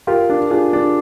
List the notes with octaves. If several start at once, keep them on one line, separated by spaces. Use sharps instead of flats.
F4 G4 A#4
D4
D4 F4 G#4
D4